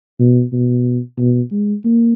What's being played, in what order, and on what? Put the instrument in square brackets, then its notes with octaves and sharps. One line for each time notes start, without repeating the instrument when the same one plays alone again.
[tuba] B2
B2
B2
G#3
A#3